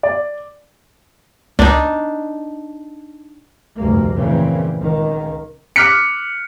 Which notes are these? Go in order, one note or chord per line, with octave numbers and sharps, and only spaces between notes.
D5
C#2 D4 D#4
F1 D2 G2 A#3
A#2 C#3 E3 A#3 C4
C#2 D#3
D6 F6 F#6 B6 C#7